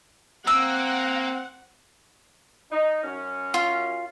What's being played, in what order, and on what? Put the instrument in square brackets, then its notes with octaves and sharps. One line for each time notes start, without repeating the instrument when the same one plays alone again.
[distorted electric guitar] A#3 [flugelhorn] C4 [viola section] F#5 [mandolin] E6
[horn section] D#4
F#2 C#4
[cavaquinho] F4